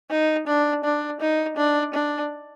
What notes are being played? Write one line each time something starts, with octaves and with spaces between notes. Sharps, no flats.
D#4
D4
D4
D#4
D4
D4